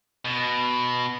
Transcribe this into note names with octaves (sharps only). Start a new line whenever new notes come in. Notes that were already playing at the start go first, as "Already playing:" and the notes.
B2